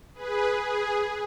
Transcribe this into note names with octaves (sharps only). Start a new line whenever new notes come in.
G#4 B4
G#4